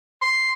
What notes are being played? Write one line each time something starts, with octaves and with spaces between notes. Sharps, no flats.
C6